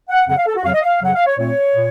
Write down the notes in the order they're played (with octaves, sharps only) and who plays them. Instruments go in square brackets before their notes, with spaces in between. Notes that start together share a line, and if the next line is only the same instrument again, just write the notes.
[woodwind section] F#5
F2 C#3 F#3 F#5
F5
A4
F#4
F2 C#3 F#3 F5
D#5
F5
F2 C#3 F#3 F#5
F5
C#5
A#2 A3 C4 C#5
A#2